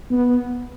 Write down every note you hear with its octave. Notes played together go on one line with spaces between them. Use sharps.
B3